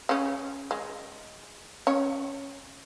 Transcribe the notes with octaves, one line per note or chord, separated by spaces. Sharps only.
C#3 C#4
G#3
C#4 C#5